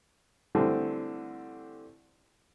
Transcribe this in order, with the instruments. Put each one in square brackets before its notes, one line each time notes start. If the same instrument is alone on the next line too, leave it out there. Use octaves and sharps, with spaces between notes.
[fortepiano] D3 E3 G3 A3 C4